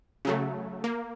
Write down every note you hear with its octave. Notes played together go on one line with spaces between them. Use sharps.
C#3 F#3 A3
A#3